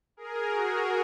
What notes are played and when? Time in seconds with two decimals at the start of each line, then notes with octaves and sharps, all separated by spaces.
0.17 G#4 A#4
0.48 F#4 G#4